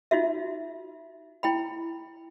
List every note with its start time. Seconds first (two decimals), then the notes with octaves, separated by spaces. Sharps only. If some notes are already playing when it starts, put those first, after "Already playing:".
0.11 D#4 F4 F#4 E5
1.43 E4 G5 B5